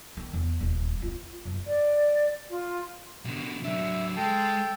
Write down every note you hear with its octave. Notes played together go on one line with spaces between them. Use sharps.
D#3
E2
D#1
F4
F#1
D5
F4
B2 D3
F#3 D4 E5
G#3 A4 G5 A5